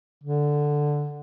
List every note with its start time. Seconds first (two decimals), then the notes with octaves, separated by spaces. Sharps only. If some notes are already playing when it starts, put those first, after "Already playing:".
0.23 D3